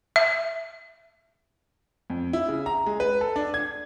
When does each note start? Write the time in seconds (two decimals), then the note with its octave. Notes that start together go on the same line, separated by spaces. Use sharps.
0.16 E5
2.10 F2
2.33 E4
2.48 C#3
2.66 A#5
2.86 G#3
3.00 B4
3.21 A4
3.36 D4
3.54 G#6